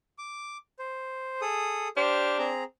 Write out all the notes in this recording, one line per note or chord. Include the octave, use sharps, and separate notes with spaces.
D6
C5
G#4 A4 D#6
D4 G4 C5 F6
C4 G#4 A#5